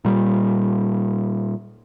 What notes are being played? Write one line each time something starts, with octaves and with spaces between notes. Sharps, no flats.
A#2 G3